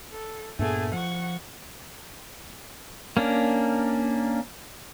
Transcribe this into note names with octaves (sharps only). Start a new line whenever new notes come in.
A4
G2 A#2 A3 B3 G#4
F3 F#5 C#6
A#3 C#4 D4